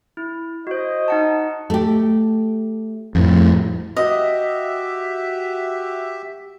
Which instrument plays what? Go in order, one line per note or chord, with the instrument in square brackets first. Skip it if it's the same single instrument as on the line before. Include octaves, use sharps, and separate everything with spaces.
[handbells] E4
[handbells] F#4 C5 [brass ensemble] D#5
[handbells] D#4 F#5 A5
[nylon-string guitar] A3 G4
[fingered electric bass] F2 A2
[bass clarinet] F#4 [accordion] G4 E5 [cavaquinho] D#5